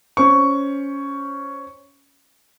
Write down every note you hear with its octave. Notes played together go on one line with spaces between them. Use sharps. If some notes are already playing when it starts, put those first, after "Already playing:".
C#4 C5 C#6